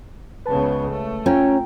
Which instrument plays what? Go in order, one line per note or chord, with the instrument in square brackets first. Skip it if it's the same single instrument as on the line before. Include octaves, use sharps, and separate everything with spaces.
[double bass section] C#2 C#3 B3 [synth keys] B4 A5
[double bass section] A3
[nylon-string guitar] C#4 [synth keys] F4 G5 A#5